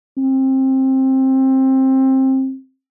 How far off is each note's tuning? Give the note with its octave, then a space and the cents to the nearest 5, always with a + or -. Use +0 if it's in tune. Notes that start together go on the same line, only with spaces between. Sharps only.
C4 +20